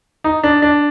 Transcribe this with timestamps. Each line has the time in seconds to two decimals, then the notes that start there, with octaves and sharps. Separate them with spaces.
0.24 D#4
0.43 D4
0.62 D4